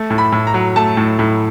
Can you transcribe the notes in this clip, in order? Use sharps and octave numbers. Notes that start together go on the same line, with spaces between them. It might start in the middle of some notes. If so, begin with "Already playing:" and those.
Already playing: A3
A2
B5
A2
A#5
F#3
A3 A5
A2
A2